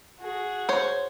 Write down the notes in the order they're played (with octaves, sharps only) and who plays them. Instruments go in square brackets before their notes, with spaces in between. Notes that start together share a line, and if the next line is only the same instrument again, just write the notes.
[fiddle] F#4 G#4
[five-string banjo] C5 C#5